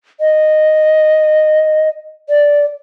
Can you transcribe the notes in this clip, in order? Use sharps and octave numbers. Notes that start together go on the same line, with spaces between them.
D#5
D5